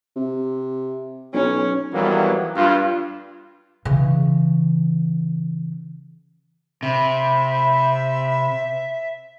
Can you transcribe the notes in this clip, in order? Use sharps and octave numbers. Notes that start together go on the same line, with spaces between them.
C3
B1 C#4
F2 E3 F#3 G3 A#3 B3
G2 F4
C#3 E3
C3 C5 E5 B5